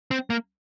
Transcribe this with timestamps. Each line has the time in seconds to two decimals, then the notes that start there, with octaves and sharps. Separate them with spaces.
0.11 C4
0.30 A#3